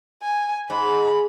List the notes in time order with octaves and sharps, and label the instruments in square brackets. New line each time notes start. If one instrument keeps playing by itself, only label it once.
[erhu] G#5
[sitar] G#2 [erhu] B5